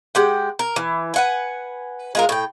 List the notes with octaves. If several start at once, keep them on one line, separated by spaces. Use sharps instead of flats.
G#3 G4 F#5
A#4
E3
B4 F#5 G#5
G#3 F4 A#4
A2 G5